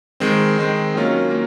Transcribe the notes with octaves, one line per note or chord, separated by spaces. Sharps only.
D#3 G#3 C4
D#3 G#3 C4
D#3 F#3 A#3 C#4 F4
A#3 F4